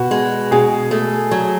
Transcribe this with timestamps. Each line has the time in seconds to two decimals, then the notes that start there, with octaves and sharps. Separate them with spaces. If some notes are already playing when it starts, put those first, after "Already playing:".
Already playing: B2 F#4
0.11 G#3
0.51 B2 G#4
0.91 A3
1.31 F#3